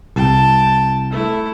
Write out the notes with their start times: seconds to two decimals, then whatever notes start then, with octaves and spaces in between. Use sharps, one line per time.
0.16 C2 G5 A5
1.11 A3 E4